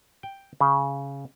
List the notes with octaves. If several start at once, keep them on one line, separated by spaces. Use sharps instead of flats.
G5
C#3